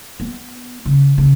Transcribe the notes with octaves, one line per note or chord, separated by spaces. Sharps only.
B3
C#3
C#3